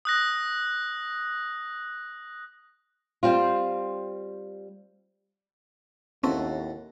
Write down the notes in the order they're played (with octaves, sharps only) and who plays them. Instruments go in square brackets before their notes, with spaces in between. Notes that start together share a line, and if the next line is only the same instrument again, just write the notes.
[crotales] D#6 F#6 A#6
[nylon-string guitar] G3 C4 F4
[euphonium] D#2 [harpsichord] A2 F#4 A4 [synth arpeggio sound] C4 C#4